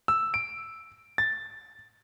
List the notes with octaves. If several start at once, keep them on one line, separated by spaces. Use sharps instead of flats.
E6
D7
A6